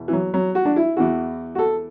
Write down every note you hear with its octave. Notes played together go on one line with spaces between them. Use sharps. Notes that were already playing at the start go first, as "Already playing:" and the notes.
Already playing: E2 B2
E3
F#3
F#3
F#4
D4
E4
E2 E3 F#4
F#4
A4